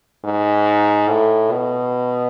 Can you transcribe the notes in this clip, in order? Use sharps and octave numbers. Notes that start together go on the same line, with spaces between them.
G#2
A2
B2